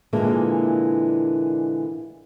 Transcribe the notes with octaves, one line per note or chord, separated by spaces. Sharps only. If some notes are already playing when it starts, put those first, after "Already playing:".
A#2 D3 E3 G#3 A#3